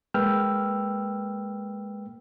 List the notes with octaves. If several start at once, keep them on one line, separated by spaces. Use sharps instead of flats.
G#3 A#3 B4 G5 E6 F6